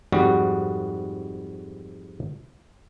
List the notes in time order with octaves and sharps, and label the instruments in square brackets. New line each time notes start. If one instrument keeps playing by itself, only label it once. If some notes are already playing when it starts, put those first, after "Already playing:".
[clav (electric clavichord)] F2 G#2 G3 F#4